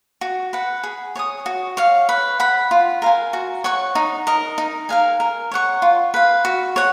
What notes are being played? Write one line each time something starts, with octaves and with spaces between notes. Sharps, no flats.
F#4
B4 F#5
G#4
C#5 G#5 D#6
F#4
C#5 F5
B4
F#5 B5
F4
A#4 F5 G#5
F#4
C#5 F#5 C#6
D#4
A#4 D#5
D#4
A#4 F5 G#5
A#4
C#5 F#5 C#6
F4
B4 F5
F#4
C#5 F#5